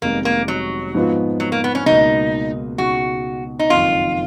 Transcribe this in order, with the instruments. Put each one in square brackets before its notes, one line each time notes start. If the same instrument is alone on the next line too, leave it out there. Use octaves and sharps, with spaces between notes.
[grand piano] F1 F2 D#3 G#3 B3 [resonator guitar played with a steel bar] A#3
[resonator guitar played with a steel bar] A#3
F#3
[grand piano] G#2 F3 B3 F4
[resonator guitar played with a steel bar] F#3
A#3
B3
C#4
[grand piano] C#2 B2 A#3 [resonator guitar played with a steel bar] D#4
[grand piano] C#2 B2 G#3 D#4 [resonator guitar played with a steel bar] F#4
[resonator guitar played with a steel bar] D#4
[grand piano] F#1 F2 D#3 [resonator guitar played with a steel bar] F4